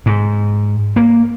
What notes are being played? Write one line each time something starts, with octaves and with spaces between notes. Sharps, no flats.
G#2
A#3